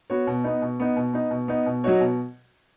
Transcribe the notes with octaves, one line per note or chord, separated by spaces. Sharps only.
B3 F#4 C#5
B2
B3 D#4
B2
B3 D#4
B2
B3 D#4
B2
B3 D#4
B2
F#3 D#4 F#4 C#5
B2